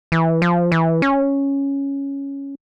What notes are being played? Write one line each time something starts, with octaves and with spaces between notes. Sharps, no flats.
E3
F3
E3
C#4